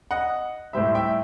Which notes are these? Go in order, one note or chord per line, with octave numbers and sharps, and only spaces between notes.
D#5 F#5
A2 G3 C5 E5
E5 G5